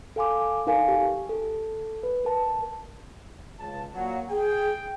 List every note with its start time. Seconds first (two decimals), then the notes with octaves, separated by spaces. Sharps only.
0.16 A4 F5 G#5 C6 D6
0.67 D#4 A4 A#4 F5 G#5
0.88 G4
1.29 A4
2.03 B4
2.25 A#4 A5
3.60 C#2 A5
3.95 A#2 F#3 F#5
4.30 G#4 G5